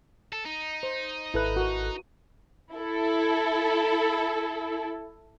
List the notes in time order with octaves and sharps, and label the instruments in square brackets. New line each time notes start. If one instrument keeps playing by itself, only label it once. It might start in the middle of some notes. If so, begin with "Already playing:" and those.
[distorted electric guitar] A4
D#4
[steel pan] C5
[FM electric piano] G#1 A4 F#6 [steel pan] E4 B4
[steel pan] F#4 A#4
[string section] E4 A4